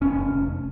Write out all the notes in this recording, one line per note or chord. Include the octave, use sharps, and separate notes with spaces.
F1 C#4
F1
F1